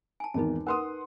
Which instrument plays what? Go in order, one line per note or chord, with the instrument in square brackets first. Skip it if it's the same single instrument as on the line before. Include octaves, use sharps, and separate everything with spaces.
[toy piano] G#5 A5
[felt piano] G#1 E2 A#4 [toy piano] D#4 A5
[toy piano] A#4 B4 [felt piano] F#5 C6 D#6